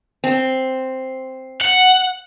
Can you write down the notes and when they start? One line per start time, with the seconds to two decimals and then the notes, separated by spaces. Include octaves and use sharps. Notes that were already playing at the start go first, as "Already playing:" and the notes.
0.24 C4
1.61 F#5